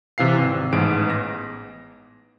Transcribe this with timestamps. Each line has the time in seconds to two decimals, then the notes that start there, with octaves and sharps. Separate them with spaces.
0.18 C3 E3 F5 C7
0.38 G#1
0.72 A1 G#2 B3 G#4 D7
1.10 A#6